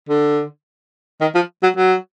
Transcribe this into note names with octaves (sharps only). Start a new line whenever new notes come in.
D3
D#3
F3
F#3
F#3